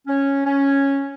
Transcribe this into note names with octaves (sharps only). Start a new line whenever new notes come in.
C#4
C#4